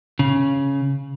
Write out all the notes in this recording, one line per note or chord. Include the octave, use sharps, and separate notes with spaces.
C#3